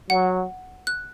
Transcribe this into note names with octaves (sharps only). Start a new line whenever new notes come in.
F#3 F#5
F#6